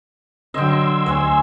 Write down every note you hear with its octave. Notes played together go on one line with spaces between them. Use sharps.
D3 F#3 D#5 G5 C6 E6 G#6
D2 C#5 F#5 G#5